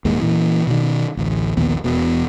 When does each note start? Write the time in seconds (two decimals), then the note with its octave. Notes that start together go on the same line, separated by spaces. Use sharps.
0.05 D#1 D#2 G#2 G#3
0.21 A#2 E3
0.67 B2 D#3
1.17 A1 D2
1.57 A#1 D#2 D#3 B3
1.84 E1 B2